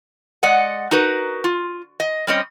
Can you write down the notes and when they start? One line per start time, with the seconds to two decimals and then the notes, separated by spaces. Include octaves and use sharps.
0.43 G#3 D5 D#5 F#5
0.91 D#4 F#4 A#4 B4
1.44 F4
2.00 D#5
2.27 G3 C4 C#4 D#5